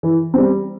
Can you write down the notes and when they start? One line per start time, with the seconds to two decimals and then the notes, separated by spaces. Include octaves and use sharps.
0.03 E3
0.34 G3 C4